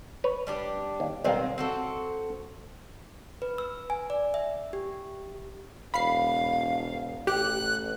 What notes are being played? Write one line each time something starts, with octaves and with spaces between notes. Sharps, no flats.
B4 C#5
G3 D4 G4
D#2
B1 D#3 G3 G#3 C4 F5
C4 F#4 A4
B4
E6
G#5
D5
E5
G4
E1 F5 B5 C7
A1 G4 F#6